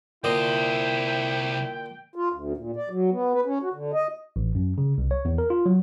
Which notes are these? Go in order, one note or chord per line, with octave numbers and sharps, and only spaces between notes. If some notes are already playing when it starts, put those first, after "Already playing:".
C2 A#2 D3 E4 C5 D#5 G5
F4
D2
A#2
D5
F#3
B3
B4
C#4
F#4
D3
D#5
A1
F#2
C#3
C2
C#5
E2
A#4
F4
F#3